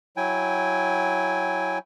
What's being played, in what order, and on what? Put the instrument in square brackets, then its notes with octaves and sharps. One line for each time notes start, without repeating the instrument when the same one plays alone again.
[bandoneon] F#3 E4 G5 G#5